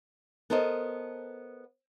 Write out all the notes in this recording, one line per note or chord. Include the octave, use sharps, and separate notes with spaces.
B3 A4 A#4 C5 D#5